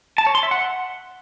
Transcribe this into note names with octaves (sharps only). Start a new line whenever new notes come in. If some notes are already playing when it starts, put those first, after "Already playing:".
A5
C#5
C6
E5
F#5